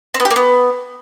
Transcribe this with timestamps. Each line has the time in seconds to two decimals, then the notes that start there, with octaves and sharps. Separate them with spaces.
0.14 C4
0.20 B3
0.25 G4
0.31 A#3
0.36 B3